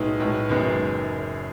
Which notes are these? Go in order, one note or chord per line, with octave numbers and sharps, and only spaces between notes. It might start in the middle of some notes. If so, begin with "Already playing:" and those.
Already playing: B1 A2 G#3 B3 D#4
B1 A2 G#3 B3 D#4
F#1 F#2 D#3 G#3 B3